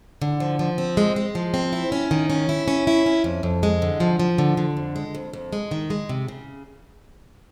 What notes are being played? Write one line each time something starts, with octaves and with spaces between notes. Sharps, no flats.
D3
F3
F3
C4
G#3
G#3
F3
C4
E4
C#4
D#3
C#4
E4
C#4
E4
C#4
F2
F2
G#3
D3
F3
F3
D3
D3
F2
G#3
F2
F2
G#3
D#3
G#3
C3
C#3